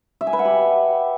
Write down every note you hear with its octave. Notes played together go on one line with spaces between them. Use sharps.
E5
G#5
B4
F#5
G4